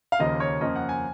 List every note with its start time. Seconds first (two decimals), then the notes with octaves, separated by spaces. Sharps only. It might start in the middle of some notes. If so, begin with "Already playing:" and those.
0.12 F5
0.19 D#2 C#3 F3 A#3 D#5
0.40 C#5
0.61 F2 F3 A#3 C#4 D#5
0.76 F#5
0.89 G#5